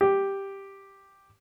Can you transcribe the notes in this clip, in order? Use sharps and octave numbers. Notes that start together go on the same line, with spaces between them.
G4